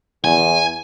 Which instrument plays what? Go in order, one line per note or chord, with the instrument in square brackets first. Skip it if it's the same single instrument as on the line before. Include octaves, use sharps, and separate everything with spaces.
[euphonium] E2 [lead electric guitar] G#5